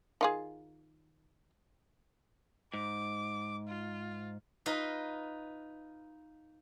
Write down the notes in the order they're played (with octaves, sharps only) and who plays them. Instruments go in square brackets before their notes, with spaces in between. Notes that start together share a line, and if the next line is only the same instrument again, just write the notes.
[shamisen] D#3 F4 G#4
[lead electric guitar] G#2 [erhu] D6
[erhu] F4
[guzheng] D#4 F4 B4 D#5